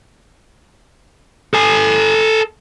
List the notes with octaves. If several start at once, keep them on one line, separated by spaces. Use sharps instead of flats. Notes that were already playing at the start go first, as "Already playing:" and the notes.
A4 G#5